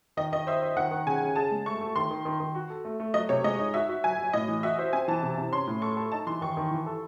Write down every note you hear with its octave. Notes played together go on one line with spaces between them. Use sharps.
D#3 D#5
D#3 D#5
C5 E5
C5
D#3 F#5
D#3
C#3 G#5
C#3
G#4 A5
G#3
A3 C#6
A3
D#3 C6
D#3
D#3
D#3
F#4
A4
A3
A3
F#3 D#5
C3 C#5
G#3 D#5
D#4
F#4 E5
F#4
F#3 G#5
F#3
A2 D#5
E3
F#4 E5
C5
C4 G#5
E3 A5
C3
C3
C#4 C6
A2
A4 C#6
A4
D#4 A5
E3 C6
D#3 C#6
D#3
E3
A4